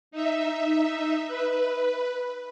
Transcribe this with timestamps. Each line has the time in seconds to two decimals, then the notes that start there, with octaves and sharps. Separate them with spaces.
0.11 D#4 E5
1.27 B4